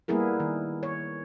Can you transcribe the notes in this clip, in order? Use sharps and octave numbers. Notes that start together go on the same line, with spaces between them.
G3 A#3 B3 E4 G#4 A#4
D#3
C#5